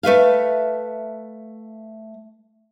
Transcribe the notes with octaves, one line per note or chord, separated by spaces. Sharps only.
A3 B4 E5 F5